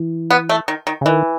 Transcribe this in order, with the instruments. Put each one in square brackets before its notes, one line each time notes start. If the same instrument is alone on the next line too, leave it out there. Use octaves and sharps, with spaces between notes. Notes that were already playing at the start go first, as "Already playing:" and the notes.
Already playing: [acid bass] E3
[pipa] B3
A3
D#3
D#3
[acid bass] C#3
[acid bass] D#3 [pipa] E3